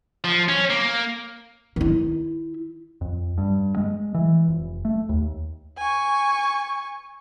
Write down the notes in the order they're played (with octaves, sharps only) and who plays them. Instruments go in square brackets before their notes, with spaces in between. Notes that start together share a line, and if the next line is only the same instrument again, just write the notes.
[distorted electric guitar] F3
C#4
A#3
[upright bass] D#3 E4
[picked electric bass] F2
G2
G#3
E3
F1
A3
D#2
[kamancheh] G#5 C#6